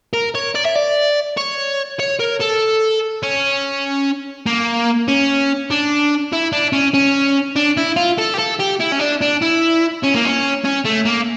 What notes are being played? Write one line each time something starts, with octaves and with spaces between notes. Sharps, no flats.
A#4
C#5
D5
E5
D5
C#5
C#5
A#4
A4
C#4
A#3
C#4
D4
E4
D4
C#4
C#4
D4
E4
F4
A4
G4
A4
G4
E4
C#4
D4
D4
E4
C#4
A#3
C#4
C#4
A3
A#3